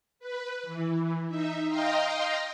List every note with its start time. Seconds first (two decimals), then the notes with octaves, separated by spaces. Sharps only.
0.19 B4
0.63 E3
1.28 D#4 E5
1.69 D#5 F5 G5 A#5 C6